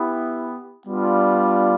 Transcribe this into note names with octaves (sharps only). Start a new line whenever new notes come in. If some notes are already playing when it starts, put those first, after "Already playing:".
Already playing: B3 E4 G4
G3 B3 D4 F4